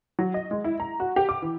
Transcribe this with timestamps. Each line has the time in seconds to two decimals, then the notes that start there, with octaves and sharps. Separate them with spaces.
0.19 F#3
0.34 D#5
0.51 G#3
0.64 E4
0.80 A#5
1.00 F#4
1.16 G4
1.29 D6
1.42 E3